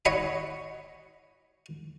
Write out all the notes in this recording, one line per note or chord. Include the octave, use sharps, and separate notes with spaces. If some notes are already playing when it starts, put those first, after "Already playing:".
C#5 D#5 F#5 B5